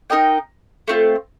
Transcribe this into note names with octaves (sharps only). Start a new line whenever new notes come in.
D#4 A#4 D#5 G5
A3 C4 F4